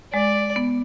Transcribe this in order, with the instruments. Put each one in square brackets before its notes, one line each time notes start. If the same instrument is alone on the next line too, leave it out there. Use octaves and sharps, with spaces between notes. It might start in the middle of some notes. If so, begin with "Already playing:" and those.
[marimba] G#3 [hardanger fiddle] D5
[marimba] B3